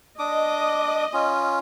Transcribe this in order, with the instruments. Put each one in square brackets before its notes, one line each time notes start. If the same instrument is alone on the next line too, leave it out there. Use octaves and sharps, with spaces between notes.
[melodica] D4 D6 D#6 [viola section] D#5
[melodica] C#4 F4